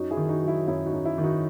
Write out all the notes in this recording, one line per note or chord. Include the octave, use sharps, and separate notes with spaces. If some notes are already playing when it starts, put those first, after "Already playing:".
Already playing: F#2 D#4 F#4
E4 G#4
D#3
D#4 F#4
F#3
E4
F#2 E4
D#4 F#4
F#2
E4
D#3
D#4 F#4